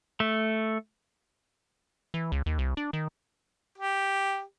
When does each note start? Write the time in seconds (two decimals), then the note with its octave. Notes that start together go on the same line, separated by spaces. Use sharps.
0.20 A3
2.14 E3
2.32 C#2
2.46 D#2
2.58 C2
2.77 D4
2.93 D#3
3.78 G4